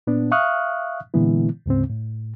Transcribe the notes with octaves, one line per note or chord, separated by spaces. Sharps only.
A#2 B3 D4
E5 F5 C#6 D#6 F6 F#6
A#2 D3 E3 G#3 B3 E4
D2 G#2 C#3 C4
A2